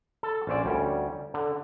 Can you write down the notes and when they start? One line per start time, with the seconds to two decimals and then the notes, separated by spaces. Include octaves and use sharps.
0.23 A4
0.47 A#1 C#4 C5 D5
0.65 D2 G3 C#4
1.34 D3